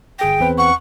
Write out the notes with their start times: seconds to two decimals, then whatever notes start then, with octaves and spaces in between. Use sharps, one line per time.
0.19 G1 G#4 G5 A#6
0.40 E2 C4 B4
0.58 F#5 C#6